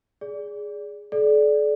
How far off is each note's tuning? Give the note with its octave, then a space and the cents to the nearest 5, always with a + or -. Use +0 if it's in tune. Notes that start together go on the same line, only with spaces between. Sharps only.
G#4 +0 D5 -15
A4 -45 D5 +0